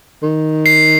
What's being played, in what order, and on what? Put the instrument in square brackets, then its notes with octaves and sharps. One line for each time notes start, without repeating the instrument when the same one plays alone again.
[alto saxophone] D#3
[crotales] C7